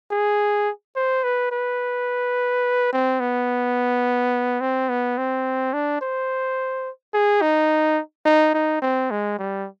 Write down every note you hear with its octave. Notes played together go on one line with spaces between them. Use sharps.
G#4
C5
B4
B4
C4
B3
C4
B3
C4
D4
C5
G#4
D#4
D#4
D#4
C4
G#3
G3